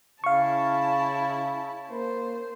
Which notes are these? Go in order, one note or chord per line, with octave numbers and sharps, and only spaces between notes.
C#3 E4 F5 A5 C#6
A#3 C5